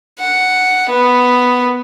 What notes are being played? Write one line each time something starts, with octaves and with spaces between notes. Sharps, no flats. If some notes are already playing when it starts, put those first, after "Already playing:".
F#5
B3